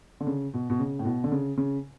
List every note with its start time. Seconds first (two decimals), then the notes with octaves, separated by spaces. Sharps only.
0.20 D3
0.27 C#3
0.54 B2
0.70 B2
0.79 C#3
0.99 A2
1.05 B2
1.24 D3
1.32 C#3
1.57 C#3